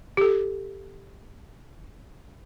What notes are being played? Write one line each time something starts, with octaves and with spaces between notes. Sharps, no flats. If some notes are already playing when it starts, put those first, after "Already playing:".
G4 A4